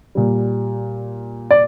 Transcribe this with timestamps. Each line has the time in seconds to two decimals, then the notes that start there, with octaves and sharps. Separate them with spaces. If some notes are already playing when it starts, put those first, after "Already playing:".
0.15 A#2 G3
1.51 D5